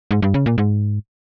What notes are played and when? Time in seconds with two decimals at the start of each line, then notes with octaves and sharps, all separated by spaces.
0.11 G#2
0.22 G2
0.34 C#3
0.46 A#2
0.58 G#2